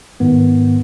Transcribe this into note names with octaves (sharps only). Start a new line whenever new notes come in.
G#2 D#3 B3